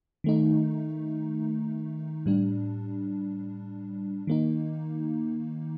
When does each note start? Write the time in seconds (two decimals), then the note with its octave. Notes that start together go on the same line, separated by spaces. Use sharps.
0.24 D#3 A3 D#4
2.26 A2 G3 D4
4.27 D#3 A#3 D#4